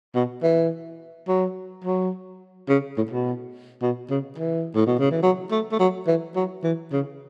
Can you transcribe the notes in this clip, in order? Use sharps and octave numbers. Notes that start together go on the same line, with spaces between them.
B2
E3
F#3
F#3
C#3
A2
B2
B2
C#3
E3
A2
B2
C#3
E3
F#3
A3
A3
F#3
E3
F#3
E3
C#3